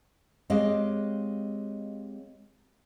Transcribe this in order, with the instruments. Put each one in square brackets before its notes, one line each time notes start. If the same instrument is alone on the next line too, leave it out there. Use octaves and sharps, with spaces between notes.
[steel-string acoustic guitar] G#3 C4 G4 C#5 D#5 F5